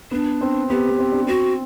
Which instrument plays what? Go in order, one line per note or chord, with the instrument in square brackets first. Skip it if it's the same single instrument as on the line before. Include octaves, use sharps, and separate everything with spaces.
[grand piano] B3 [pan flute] D4
[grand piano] C4
[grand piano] B3 [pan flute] G4
[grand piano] B3
C4
D4
[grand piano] C4 [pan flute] F#4